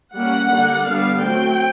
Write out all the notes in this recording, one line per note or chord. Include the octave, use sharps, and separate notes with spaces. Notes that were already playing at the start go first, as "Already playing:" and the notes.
G3 A#3 C#4 F#5
D3 G3 A#3 D4
D3 G3 B3 D4 F5
F#3 A3 C4 G5